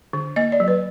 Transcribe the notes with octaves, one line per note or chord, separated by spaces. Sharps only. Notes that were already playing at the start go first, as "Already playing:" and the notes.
D3
A#3 D#5
D5
F#3
B4